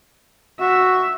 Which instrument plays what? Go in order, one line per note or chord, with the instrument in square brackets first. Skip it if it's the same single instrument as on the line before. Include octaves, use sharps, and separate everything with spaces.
[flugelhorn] F#4 [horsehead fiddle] E5